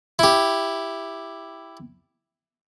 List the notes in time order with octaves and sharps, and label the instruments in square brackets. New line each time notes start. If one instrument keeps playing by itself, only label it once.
[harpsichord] E4 G4